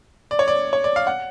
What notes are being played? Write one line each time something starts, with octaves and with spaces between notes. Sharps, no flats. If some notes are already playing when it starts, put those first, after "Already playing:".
D5
C#5
D5
C#5
D5
F5
F#5